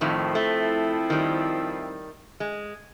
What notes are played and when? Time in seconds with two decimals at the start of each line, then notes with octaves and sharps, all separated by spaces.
0.01 F2 A2 D#3 F3 C4 E4
0.35 A3
1.10 D#3 G3
2.40 G#3